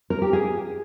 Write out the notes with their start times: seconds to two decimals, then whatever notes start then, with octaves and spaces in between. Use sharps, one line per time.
0.10 A#4
0.22 G4
0.33 G#4